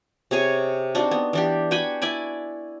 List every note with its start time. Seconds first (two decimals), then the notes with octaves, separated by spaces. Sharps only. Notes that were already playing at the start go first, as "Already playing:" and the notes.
0.31 C3 G#4 C#5 G#5
0.95 C4 D4 D#4 F#4
1.11 B3
1.33 E3 D4 G4
1.71 F#4 G5 G#5 B5
2.02 E4 D5 G#5 B5